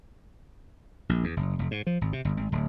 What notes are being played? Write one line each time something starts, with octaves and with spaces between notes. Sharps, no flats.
A#1
E2
F#1
F1
G#2
F3
G#1
C3
G1
G#1
D1